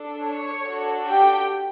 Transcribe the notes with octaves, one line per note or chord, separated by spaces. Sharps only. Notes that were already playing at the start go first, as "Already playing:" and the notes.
Already playing: D4 A4
C#5
D4 F#4 A4
G4 G5